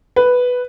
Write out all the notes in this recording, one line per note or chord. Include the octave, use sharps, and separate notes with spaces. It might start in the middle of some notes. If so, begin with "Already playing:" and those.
B4